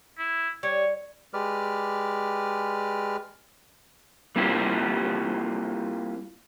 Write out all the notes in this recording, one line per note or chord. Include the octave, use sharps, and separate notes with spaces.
E4
G3 C#5
G#3 G4 B4 D5 F6
G3 A#3 C4 E4 F4 G4